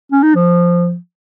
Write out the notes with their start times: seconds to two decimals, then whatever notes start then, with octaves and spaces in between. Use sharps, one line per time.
0.12 C#4
0.23 D#4
0.35 F3